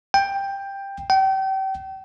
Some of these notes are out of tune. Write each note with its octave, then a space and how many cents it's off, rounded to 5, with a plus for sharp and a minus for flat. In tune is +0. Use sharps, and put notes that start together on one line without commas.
G5 +10
G5 -35